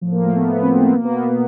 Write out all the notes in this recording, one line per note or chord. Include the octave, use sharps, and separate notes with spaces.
A2 F3
A#3
A3
B3
B3
C4
C4
B3
B2 A#3
B3